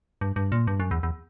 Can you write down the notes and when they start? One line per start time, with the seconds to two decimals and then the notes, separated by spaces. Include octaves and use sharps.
0.21 G2
0.36 G2
0.52 A#2
0.67 G2
0.80 F#2
0.91 E2
1.03 E2